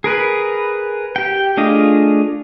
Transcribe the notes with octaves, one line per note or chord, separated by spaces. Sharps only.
G#4 A#4 B4 B5
G4 G5
A3 D4 F4 G#4 D#5